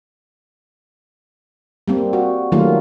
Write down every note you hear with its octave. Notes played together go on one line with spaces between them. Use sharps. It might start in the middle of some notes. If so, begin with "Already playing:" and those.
G3 A#3 C4
F#4
D#3 F#3 G3 A3 A#3 F4